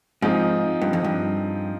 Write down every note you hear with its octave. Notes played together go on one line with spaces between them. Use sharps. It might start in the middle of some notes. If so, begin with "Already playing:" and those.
G#2 F3 C4 D#4 G#4
G2
F2
G2